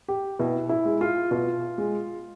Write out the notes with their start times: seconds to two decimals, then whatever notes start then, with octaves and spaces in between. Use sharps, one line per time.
0.08 G4
0.39 B2 E4
0.69 E4
0.86 G#3
1.01 F4
1.31 B2 F4
1.78 G#3